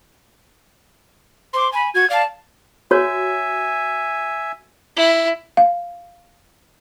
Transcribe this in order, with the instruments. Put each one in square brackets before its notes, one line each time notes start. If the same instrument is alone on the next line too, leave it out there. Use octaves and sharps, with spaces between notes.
[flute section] C5 D6 [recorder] C6
[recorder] G#5 [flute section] B5
[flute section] F#4 [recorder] G#6
[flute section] D5 A5 [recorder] F5
[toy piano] F#4 C#5 [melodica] E5 G#5
[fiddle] E4
[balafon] F5